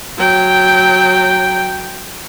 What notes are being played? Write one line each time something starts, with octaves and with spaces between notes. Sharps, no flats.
F#3 G5